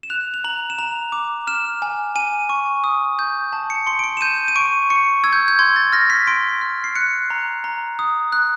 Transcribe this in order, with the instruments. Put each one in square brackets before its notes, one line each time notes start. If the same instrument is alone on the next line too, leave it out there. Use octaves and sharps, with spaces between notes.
[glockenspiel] E7
F#6 F7
F7
A#5 F#7
E7
A#5 F7
D6
F6 E7
G#5
G#5 D#7
C#6
D#6
G6
A5
C#7
C6 C#7
D7
C#7
E7
G6 D#7
D#7
C#6 D7
C#6 C#7
E6 G#6
G6
G6
C6 G#6
A6
F6 A#6
B6
C6 D7
F6
C7
F#6 C#7
A#5
A#5
D#6
F#6